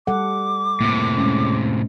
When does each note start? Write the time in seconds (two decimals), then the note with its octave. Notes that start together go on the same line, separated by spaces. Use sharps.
0.07 G3 A4 F#5 D6
0.81 A2 C3 A#3
1.17 G#3 C#4